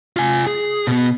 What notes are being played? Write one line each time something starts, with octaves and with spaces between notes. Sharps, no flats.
F4 G#5
G#4
B2 B3